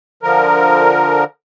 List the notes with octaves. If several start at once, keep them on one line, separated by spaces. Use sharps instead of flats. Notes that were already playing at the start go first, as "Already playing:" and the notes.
D3 F3 A#4